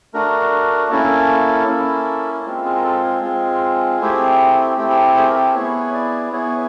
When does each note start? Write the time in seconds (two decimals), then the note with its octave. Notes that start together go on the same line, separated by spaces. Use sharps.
0.14 A3 D4 F#4 A#4
0.90 A#3 C#4 E4 A4
1.68 A#3 C#4 E4
2.46 G#3 C4 F4
2.65 G#4
2.76 A#4
2.84 A4
3.03 G#4
3.22 G#3 C4 F4
4.01 A3 C4 E4 G4
4.78 A3 C4 E4 G4
4.91 G#4
4.96 A4
5.17 G#4
5.29 A#4
5.35 A4
5.54 B3 E4 G#4 C#5
5.94 D5
6.32 B3 E4 G#4 C#5